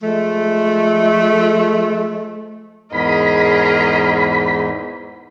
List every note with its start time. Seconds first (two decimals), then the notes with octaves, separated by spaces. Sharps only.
0.03 F3 G#3 A3
2.93 E2 G#2 G#4 A#4 D#5 B5